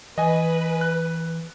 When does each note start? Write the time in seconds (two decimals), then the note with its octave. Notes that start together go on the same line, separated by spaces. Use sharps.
0.18 E3 B4 D#5 G#5
0.81 F#6